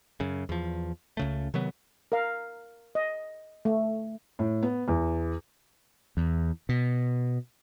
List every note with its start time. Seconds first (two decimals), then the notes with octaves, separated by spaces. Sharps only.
0.20 F#2 C#3
0.49 E2 F3
1.17 C#2 C#3 A3
1.54 C3 D#3 F#3 B3
2.12 A#4 F5
2.95 D#5
3.65 A3
4.39 A2
4.63 B3
4.88 E2
6.17 E2
6.69 B2